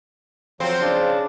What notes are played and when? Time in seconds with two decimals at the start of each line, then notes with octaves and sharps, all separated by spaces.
0.60 F3 F#3 C4 C5
0.81 C#3 D4